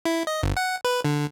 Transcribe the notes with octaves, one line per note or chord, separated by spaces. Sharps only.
E4
D#5
G1
F#5
B4
D3